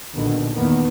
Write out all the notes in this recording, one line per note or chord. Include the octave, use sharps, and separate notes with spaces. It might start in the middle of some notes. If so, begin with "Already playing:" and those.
A#1 B2 D3 D#3
E2 D#3 A#3 B3